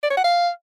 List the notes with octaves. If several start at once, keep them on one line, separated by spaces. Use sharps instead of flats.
D5
C#5
F#5
F5